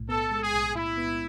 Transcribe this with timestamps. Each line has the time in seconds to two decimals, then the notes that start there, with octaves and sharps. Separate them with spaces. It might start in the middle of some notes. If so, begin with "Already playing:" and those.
Already playing: B1 A2
0.09 B3 A4
0.31 G#3
0.42 G#4
0.53 B1
0.75 A2 E4
0.97 B3